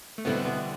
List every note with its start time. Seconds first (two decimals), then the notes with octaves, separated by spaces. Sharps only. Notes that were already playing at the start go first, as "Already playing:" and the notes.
0.18 A3
0.25 E2 B2 D3 G3 B3 C4 E4
0.45 B2 B3